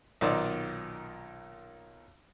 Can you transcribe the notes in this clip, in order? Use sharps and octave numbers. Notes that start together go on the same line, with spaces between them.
B1 A#2 D#3 D#4 C5 D5